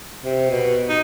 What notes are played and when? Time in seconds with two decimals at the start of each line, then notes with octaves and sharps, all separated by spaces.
0.24 C3
0.50 B2
0.89 D#4